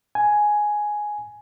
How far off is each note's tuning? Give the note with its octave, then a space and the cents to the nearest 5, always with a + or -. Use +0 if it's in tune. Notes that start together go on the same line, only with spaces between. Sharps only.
G#5 +5